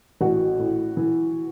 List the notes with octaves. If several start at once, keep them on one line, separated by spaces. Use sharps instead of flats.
A1 F#4 F#5
A2
E3